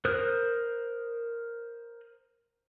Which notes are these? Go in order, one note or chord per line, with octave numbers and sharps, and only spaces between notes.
A#4 C5 D#6 F#6